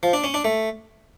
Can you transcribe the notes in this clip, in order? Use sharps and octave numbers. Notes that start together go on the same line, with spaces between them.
F3
D4
C#4
D4
A3